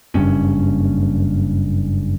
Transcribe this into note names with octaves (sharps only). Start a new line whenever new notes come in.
F#1 G2 C#4